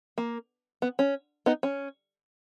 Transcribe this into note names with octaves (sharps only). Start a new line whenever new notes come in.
A#3
B3
C#4
B3 D#4
C#4